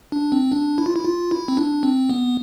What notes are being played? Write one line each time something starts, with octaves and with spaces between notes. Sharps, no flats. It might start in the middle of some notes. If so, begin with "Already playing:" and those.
D4
C4
D4
E4
F4
E4
F4
E4
C4
D4
C4
B3